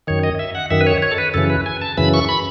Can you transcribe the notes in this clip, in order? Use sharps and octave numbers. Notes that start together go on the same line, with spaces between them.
F#2 D#3 C#5
D#5
E5
F#5
F#2 D#3 E5
B4
C#5
C#5
A4
B4
F#2 C#3 E3 A4
B4
G#5
A5
F#2 C#3 E3 B5
C#6
B5